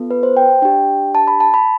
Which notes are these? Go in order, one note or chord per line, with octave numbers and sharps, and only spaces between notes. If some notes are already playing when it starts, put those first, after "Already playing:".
Already playing: B3 F4 A4
B4
C5
G5
D4 G4 G5
A5
B5
A5
B5